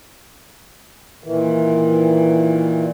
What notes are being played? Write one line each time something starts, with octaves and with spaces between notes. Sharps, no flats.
A#2 D#3 E3